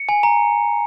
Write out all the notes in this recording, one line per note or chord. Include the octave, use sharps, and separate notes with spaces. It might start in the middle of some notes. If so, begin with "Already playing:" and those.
Already playing: C#7
G#5
A#5